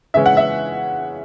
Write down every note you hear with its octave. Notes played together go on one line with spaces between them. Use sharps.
C#3 E3 G#3 C#4 E4 E5
F#5
E5